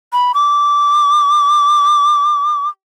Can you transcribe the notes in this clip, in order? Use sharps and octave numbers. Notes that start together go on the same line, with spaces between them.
B5
D6